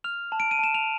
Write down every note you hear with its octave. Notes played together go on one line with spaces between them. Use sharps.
F6 F7
A5
D7
D#7
A5 E7
F7